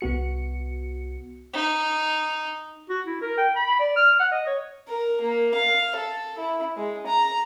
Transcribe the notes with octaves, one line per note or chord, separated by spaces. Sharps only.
C2 B3 F#4 C#7
D#4
F#4
E4
A#4
G5
B5
D5
F6
F#5
D#5
C#5
A#4
A#3
F5
A4
E4
G#3
A#5